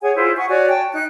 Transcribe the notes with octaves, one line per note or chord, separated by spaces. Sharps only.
G#4 C#5 F#5 G#5
E4 F4 G#4 C5
F#5 G#5 C#6
F#4 C#5 D5 G#5
G5 A5
D#4 F#6